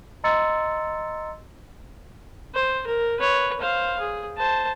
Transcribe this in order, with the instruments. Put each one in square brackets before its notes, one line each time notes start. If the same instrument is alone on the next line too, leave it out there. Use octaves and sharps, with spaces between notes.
[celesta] D#5 A#5 C6 E6 A6 C#7
[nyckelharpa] C5
A#4
B4 C#5
C5 F5
G#4
C5 A5